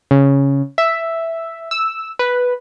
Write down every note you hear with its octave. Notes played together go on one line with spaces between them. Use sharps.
C#3
E5
E6
B4